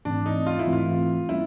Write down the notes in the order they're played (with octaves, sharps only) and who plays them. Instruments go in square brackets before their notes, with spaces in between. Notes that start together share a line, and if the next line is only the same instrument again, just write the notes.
[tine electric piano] G#2 E3 A3 C4 [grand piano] D4
[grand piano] D#4
F4
E4
[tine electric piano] G#2 E3 A3 C4
[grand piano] F4
[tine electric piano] G3 A#3 C#4 [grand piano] E4